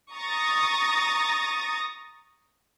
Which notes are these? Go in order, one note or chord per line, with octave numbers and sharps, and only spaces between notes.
A#5 C#6 D#6 A6 A#6